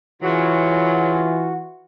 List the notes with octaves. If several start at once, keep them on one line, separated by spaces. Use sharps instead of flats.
C#3 E3 F#3 F4 F#4